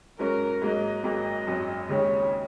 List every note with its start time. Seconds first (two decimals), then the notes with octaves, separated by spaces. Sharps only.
0.19 G#2 F#3 C#4 A#4
0.62 G#2 F#3 A#3 D#5
1.04 G#1 G#2 F#3 A#3 D#5
1.47 G#1 F#2 F#3
1.89 D#2 C#3 G#3 D#4 C#5